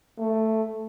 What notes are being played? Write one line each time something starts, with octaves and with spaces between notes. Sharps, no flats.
A3